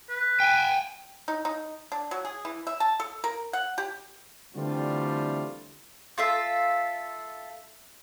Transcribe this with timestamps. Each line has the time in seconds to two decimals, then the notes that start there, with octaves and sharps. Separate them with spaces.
0.10 B4
0.40 G5 G#5
1.28 D#4
1.45 D#4
1.92 D4
2.11 F#3
2.25 G#4
2.45 E3
2.67 E5
2.80 A5
3.00 A4
3.24 A#4
3.53 F#5
3.78 G4
4.55 D3 E3 G3 A3 C4 F4
6.18 F4 A4 E5